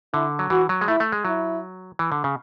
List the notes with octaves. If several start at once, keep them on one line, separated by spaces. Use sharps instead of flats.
D3 E4
F#3
E3 F#4
F#3
G#3
A3 E4
A3
G#3
F#3 E4
E3
D3
C#3